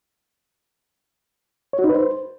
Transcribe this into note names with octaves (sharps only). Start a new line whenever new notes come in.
C#5
F#4
D#4
B4
C5